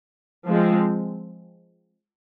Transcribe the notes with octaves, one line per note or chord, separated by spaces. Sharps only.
F3 G#3 C4